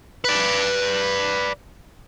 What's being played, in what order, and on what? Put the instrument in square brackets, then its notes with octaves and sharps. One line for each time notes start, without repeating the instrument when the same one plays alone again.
[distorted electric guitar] B4 D5